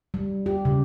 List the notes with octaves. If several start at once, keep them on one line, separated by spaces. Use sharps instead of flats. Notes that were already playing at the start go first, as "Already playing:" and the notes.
G3
G4
C#3